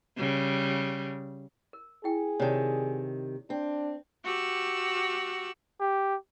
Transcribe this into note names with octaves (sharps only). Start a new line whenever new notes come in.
C#3 G3
A#4
E4 G#4 G5
C3 D#3 C#5 D5 A5
C4 D4
F#4 G4 E6 F#6
G4